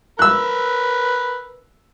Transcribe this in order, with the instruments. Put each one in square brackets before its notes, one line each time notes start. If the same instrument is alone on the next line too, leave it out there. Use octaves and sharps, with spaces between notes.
[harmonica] A#4 B4 [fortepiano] E6 F#6